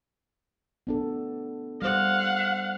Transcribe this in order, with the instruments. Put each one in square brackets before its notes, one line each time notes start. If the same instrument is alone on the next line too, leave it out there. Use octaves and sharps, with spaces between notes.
[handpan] B3 D4 A4
[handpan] G3 C5 [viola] F5 F#5